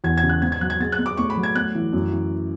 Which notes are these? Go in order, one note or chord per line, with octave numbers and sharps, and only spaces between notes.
E2 G#6
G#6
C#3
F#6
G#2 G#6
G#6
F#3 F#6
G#6
G#3 A6
F#6
G#3
D6
A2 C#6
B5
F#3
G#6
A2 F#6
E3
F#2
E3